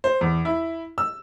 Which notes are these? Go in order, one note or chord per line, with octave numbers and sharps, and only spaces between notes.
C5
E2
E4
E6